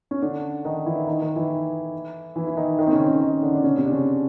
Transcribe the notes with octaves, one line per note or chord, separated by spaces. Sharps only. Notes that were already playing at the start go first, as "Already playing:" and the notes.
C#4
D3 D4
D#3 D#4
E3 E4
D#3 D#4
D#3 D#4
E3 E4
E3 E4
E4
D#3 D#4
D#3 D#4
C4
C#3 C#4
C#3 C#4
D#3 D#4
D3 D4
D4
C#3 C#4
C3 C4
D4
C#3 C#4